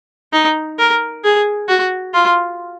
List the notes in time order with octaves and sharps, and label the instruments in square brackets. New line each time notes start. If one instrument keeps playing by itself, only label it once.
[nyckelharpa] D#4
A#4
G#4
F#4
F4